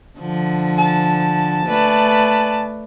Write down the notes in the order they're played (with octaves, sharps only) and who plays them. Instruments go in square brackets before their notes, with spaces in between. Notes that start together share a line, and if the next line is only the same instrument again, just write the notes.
[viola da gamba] D3 F3
[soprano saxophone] A5
[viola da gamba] A3 B4 D5